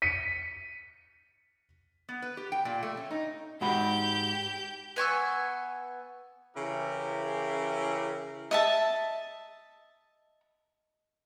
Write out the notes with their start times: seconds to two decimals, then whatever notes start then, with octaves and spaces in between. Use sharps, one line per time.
0.02 B6 C#7 D#7
2.09 B3
2.22 B4
2.37 G4
2.52 G5
2.65 A#2
2.83 A3
2.97 C#4
3.11 D#4
3.61 G#2 F#4 G4 B5 G6
4.96 B3 G#5 C#6 E6
6.55 C#3 E3 E4 G4 A#4
8.51 D#5 E5 A5